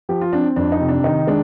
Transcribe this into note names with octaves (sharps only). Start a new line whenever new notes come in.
F3 G4
F4
C4 D4
F2 D4
D#4
C3
D4
D#3 D#4
G#3 D4